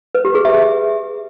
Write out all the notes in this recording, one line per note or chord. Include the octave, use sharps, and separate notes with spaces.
B4
G4
G#4
E5